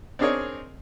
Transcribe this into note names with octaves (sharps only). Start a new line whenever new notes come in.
C4 D4 D#4 G#4 A#4 C#5